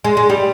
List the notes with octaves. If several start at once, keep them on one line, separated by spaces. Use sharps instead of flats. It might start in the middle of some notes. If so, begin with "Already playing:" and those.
G#3
G#3
G3